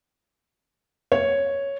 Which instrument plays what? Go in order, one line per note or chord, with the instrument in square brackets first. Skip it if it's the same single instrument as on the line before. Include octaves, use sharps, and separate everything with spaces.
[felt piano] C#5